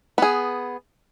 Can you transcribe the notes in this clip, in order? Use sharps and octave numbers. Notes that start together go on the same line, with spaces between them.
B3 G#4